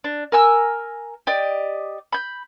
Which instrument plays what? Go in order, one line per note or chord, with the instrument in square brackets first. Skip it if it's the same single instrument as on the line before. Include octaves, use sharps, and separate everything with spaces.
[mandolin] D4
A#4 G#5 E6
G4 D5 D#5
B5 G6